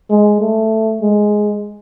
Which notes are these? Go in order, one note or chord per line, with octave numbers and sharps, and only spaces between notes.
G#3
A3
G#3